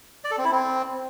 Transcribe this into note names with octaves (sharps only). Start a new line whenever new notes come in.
D5
A4
C4
E4
C4